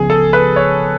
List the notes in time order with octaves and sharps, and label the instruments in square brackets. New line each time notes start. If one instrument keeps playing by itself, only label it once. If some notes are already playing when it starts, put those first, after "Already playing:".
Already playing: [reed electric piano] C#2 C#3 F3 B3 [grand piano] G#4
[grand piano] A4
B4
C#5